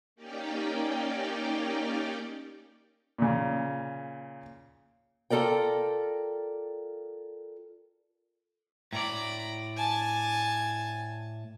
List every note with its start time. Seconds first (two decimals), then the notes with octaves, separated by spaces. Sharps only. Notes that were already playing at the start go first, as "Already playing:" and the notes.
0.16 A#3 C#4 D#4 G4 D5 G5
3.18 A#2 C#3
5.30 F4 A4 A#4 D5 G5
8.93 A2 D5 A#5 B5
9.77 G#5 A5